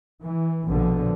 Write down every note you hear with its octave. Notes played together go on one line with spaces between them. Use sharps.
E3
A#1 B2 D3 F3